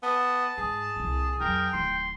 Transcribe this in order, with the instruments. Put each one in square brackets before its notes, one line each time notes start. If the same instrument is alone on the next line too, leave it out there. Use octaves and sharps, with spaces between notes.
[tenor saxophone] B3 [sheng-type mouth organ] A5
[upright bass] G#2 [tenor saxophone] G#4
[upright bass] C2 A#2
[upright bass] F2 F#3 [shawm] A#4 [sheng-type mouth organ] G5
[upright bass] D1 D#3 [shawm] C6